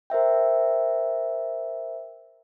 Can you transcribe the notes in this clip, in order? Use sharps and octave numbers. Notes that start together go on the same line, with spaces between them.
A#4 C5 E5 G5